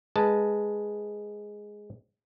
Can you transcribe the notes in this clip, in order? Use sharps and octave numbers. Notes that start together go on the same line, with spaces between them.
G#3 B4 A5